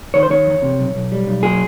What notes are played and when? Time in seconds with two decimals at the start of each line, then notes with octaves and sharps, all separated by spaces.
0.14 D#3 C#5
0.23 C5
0.30 D#3 C#5
0.47 E2
0.62 C3
0.79 B1
0.95 B1
1.12 G3
1.27 B1
1.43 F#3 G#4